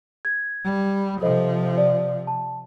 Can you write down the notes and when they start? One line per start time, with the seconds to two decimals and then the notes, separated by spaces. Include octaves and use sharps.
0.25 G#6
0.64 G3
1.22 C3 F3 A4 C5 D#5
1.78 D5
2.27 A5